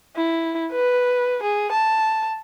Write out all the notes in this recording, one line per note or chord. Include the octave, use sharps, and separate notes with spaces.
E4
B4
G#4
A5